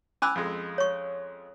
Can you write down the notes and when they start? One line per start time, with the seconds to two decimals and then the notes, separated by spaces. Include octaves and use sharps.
0.22 C#4 G#5 B5 D6 E6 F#6
0.35 F2 G#3
0.78 C#5 C#6